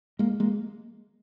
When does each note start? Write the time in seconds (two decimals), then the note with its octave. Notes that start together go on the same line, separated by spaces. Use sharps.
0.19 G#3 A#3
0.40 G#3 A#3